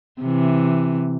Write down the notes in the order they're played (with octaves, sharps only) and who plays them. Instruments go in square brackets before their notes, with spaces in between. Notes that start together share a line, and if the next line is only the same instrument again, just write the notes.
[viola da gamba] C3 E3